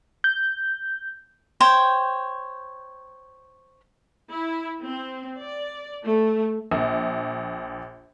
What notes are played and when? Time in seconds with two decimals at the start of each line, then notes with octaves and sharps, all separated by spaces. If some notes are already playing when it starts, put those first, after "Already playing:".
0.24 G6
1.60 C5 C#5 G5
4.29 E4
4.83 C4
5.41 D5
6.05 A3
6.71 A#1